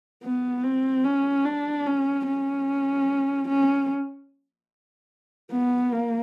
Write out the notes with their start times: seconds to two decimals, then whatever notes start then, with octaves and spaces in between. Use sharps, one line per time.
0.24 B3
0.64 C4
1.04 C#4
1.45 D4
1.86 C#4
2.26 C#4
3.48 C#4
5.51 B3
5.92 A#3